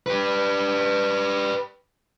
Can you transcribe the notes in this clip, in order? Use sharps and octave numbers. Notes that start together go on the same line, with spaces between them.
G4 B4